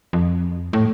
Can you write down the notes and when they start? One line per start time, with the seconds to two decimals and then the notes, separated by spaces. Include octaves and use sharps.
0.13 F2
0.73 A2